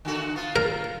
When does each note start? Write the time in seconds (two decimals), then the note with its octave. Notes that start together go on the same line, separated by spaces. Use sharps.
0.05 D3 A3 F#4
0.36 B3 F4
0.56 A#4